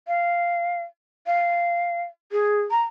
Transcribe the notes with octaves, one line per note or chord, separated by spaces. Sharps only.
F5
F5
G#4
A#5